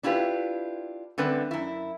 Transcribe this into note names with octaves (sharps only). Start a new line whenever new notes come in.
D4 E4 F4 G4 B4
D3 G3 A3 C4 B4
F#2 E4